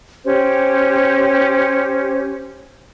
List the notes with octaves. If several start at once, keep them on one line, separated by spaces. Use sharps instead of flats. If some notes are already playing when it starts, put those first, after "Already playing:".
C#4 G4 C5